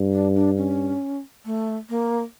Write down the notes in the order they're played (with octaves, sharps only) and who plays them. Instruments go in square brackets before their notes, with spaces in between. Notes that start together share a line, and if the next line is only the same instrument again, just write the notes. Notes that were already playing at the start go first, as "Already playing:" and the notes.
Already playing: [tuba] G2
[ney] D4
D4
C#4
A3
A#3